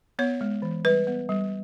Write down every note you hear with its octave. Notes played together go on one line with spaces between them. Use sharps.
B3 C#5
G#3
E3
G3 B4
B3
G3